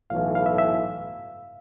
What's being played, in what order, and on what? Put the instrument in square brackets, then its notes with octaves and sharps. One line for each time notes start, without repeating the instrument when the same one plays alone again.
[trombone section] B1 A2 E3 [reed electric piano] F5
[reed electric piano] F5
E5
E5